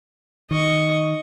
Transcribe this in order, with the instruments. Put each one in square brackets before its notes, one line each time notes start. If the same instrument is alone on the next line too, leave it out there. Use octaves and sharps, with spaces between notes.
[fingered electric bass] D#3 [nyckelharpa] D#5 C#6